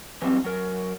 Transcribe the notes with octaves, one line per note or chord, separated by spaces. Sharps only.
E3 F#3 G3 A#3 C4
F#3 A#4